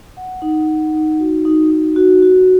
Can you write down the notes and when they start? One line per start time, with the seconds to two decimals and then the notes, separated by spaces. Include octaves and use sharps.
0.17 F#5
0.42 D#4
0.67 D#4
0.94 D#4
1.19 F#4
1.45 D#4
1.71 D#4
1.96 F#4
2.22 F#4